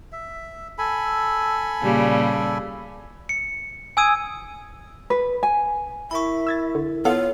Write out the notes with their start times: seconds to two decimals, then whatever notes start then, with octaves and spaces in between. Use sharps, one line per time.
0.12 E5
0.78 A4 G#5 B5
1.82 A#2 C#3 G3
3.29 C#7
3.97 G#5 D#6 E6 G#6 D#7
5.10 B4
5.43 G#5
6.11 E4 A#4 E5 B5 C#6
6.47 E6 G#6 A6
6.75 D3
7.05 B3 F4 A4 C#5 F5